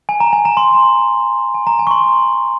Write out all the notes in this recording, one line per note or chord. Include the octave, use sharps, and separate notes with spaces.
G#5
A#5
G#5
A#5
C6
G#5
A#5
G#5
C#6
C6